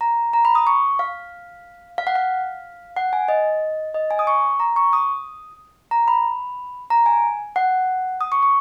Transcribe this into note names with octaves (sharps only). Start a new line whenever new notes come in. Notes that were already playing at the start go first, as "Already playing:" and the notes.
A#5
A#5
B5
D#6
C#6
F5
F5
F#5
F5
F#5
G#5
D#5
D#5
G#5
D#6
C#6
A#5
C#6
D#6
A#5
B5
A#5
G#5
F#5
D#6
C#6
C#6